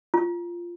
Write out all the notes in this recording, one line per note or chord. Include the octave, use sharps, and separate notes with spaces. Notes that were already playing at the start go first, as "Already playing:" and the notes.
F4